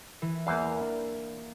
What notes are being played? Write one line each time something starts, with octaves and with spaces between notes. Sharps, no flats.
E3
E2 E3 A#3 C5 F5
D4